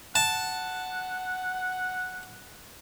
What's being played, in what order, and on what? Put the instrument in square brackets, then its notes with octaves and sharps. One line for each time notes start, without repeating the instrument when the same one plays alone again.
[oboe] F#5 [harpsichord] A5